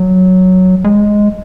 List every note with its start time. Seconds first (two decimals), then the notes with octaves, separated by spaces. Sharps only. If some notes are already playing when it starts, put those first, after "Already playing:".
Already playing: F#3
0.84 G#3